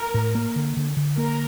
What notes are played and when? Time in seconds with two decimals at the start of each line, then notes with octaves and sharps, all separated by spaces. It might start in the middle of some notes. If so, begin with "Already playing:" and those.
Already playing: A#4
0.14 A2
0.35 A#3
0.56 D3
0.77 D3
0.97 D3
1.18 A#3 A#4